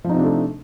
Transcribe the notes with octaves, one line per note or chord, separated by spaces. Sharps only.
C3 F3 A3 D4 D#4